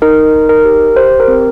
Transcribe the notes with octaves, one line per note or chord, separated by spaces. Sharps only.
D#4 A#4
D#4
A#4
G4
G4 C5
A#4
C4